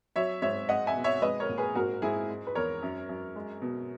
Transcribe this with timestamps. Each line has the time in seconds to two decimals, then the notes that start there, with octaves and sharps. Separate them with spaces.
0.16 F#3 C#5 E5
0.42 G#2 C#5 E5
0.69 G#3 D#5 F#5
0.87 E5 G#5
0.96 B2
1.04 C#5 E5
1.22 G#3 B4 D#5
1.40 A#4 C#5
1.49 A#2
1.58 G#4 B4
1.75 G#2 F#4 A#4
2.02 G#2 E4 G#4
2.29 G#3
2.47 B4
2.55 E2 A#4 C#5
2.83 F#2
3.09 F#2
3.36 G#3
3.62 B2